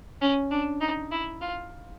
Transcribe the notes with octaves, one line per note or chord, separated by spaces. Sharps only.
C#4
D4
D#4
E4
F4